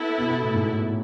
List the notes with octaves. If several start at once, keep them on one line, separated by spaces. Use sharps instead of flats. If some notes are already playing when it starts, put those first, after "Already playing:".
Already playing: B3 E4 A4
B2
B2
A2
G#2
A2
A2